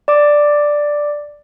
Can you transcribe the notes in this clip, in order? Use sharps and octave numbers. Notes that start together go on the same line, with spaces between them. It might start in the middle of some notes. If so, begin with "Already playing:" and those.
D5 D6